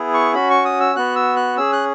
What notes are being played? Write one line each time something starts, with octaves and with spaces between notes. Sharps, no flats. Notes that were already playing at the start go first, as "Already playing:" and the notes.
Already playing: B3 E4 G#4
C#6
C#4 F#4 B5
C#6
D#6
E6
B3 F#4 F#6
E6
F#6
C#4 G#4 E6
F#6